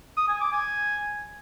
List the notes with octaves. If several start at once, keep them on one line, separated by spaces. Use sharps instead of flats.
D#6
G#5
D6
G#5